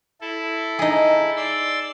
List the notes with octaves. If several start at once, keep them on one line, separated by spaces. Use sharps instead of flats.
E4 A4
D#4 G#4
D5 C6 E6